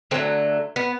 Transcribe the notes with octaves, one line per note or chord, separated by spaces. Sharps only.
D3 F#3 A3 C4
B3